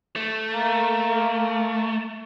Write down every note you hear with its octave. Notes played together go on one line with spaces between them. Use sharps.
A3
A#3